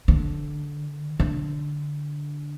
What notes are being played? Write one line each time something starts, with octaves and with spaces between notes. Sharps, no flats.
D3
D3